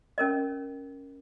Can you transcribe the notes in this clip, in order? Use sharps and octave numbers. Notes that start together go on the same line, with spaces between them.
C#4 A#4 D#5